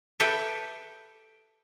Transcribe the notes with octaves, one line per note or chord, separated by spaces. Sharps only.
G4 A4 B4 E5 G5